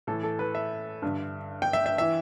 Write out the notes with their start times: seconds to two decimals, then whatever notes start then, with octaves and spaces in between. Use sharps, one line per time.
0.07 A2 E3 A4
0.23 A4
0.39 B4
0.55 E5
1.02 G2 D3
1.62 G5
1.73 E5
1.86 E5
1.98 E3 E5